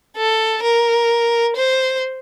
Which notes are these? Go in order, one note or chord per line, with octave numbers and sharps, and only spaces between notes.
A4
A#4
C5